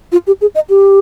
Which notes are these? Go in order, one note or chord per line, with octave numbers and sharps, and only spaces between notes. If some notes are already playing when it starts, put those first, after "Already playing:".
F4
G4
G#4
D#5
G4